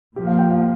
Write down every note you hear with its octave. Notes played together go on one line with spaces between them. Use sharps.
A#2 F3 A#3 G4
F5
G5
F5